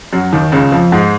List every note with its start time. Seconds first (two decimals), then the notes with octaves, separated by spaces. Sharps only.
0.13 F#2 F#3
0.33 D#2 D#3
0.52 C#2 C#3
0.72 F2 F3
0.92 G#2 G#3